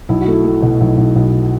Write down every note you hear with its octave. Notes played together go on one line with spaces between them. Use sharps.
B1 E4
F#4
A3 E4
A3
B2
B1
B1
B1